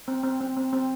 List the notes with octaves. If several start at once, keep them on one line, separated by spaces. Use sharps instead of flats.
C4
C4
C4
C4
C4